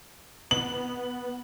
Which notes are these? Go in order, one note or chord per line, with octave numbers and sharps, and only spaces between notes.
B3 F#7